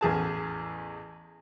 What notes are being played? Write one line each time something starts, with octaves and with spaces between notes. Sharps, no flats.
A1 E2 G#4 A5